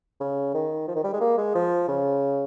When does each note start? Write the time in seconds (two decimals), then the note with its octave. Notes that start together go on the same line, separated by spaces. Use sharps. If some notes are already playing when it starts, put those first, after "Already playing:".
0.20 C#3
0.54 D#3
0.88 F3
0.96 D#3
1.04 G3
1.13 G#3
1.21 A#3
1.38 G#3
1.55 F3
1.88 C#3